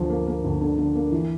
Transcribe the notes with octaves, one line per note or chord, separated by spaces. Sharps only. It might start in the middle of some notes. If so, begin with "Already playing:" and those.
Already playing: D2 F3
A#3
A#3
D2
D3
D3
A#3
E3